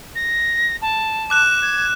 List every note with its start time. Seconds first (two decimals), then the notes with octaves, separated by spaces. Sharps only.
0.15 A#6
0.81 A5
1.30 D6 F#6 E7
1.62 G#6